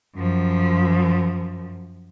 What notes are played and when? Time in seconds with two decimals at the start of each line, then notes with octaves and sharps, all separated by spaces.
0.16 F#2 F3